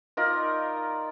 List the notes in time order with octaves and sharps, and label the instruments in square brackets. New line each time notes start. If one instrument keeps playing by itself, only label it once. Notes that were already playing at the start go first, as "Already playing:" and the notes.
[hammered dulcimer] D#4 F4 A#4 D5